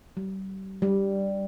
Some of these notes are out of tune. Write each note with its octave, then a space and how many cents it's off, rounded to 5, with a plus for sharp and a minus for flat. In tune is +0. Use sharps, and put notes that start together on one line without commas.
G3 -35
G3 +0